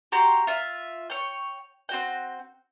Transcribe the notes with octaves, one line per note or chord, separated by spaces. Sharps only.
F#4 G4 A#5 C6
F4 E5
C#5 G5
C4 F#4 G5